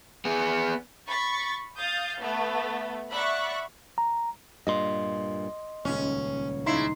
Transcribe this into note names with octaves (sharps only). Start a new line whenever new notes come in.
B3 G#4
B5 C#6 A6
F5 D#6 G6 A6
A3 B3
D5 E5 F#5 B5 C#6 F#6
A#5
G2 A#2 D#5 C6
D#1 C#2 C#4
C#3 D#4 E4 C6 C7